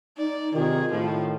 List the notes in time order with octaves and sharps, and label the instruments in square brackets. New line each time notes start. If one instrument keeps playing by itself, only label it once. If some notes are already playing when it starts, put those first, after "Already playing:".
[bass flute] D#4 [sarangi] D5
[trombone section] C3 D#3 [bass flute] F4 [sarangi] G#4
[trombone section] A2 D#3 [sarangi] F3